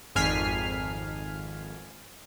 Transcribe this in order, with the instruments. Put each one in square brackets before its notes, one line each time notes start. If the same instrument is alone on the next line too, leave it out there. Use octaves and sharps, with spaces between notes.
[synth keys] G#1 F2 G#5 F6 B6 C7